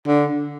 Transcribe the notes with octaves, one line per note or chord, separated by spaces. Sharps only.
D3